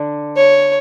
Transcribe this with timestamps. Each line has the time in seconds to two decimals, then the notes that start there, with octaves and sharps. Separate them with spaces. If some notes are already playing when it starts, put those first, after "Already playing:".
Already playing: D3 D4
0.36 C#5